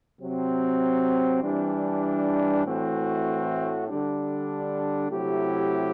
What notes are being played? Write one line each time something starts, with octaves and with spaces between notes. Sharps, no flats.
C3 F#3 C4
E3 G3 D4
A2 E3 A3 C4 F#4
D3 G3 D4
C3 F#3 A3 E4 G4